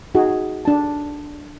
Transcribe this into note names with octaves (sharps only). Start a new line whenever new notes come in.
D#4 F#4 G#4
D4 A5